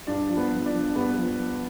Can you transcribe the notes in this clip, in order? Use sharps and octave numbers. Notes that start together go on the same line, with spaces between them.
G2 D4 D5
F3
B3 B4
F3
D4 D5
F3
G2 B3 B4
F3
F3